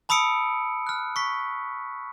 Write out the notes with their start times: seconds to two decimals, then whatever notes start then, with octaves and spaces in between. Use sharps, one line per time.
0.09 A5 B5 D#6 E6 C#7 D7
0.87 F6 F#6
1.16 C#6 B6